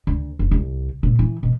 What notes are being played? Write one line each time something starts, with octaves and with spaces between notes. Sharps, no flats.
D2
F1
C2
A#2
E3
B2